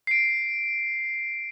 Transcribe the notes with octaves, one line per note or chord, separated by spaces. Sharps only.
C7 D7